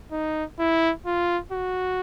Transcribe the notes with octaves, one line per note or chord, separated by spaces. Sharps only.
D#4
E4
F4
F#4